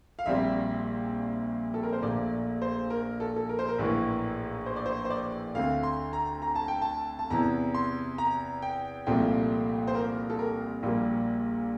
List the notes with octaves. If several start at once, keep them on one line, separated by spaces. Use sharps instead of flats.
F5
A#1 A#2 G3 C4 E5
A4
A#4
C5
A#1 A#2 A3 D5
C5
A#4
A4
A4
A#4
C5
A#4
A#1 A2 E3 A#3
C5
D5
C5
C5
D5
D2 D3 A3 C4 F5
C6
A#5
A#5
A5
G5
A5
A5
E2 C3 E3 A#5
C6
A#5
G5
C2 A#2 F3 A3 C4 G5
C5
A#4
A4
A#4
A#1 A#2 G3 A#3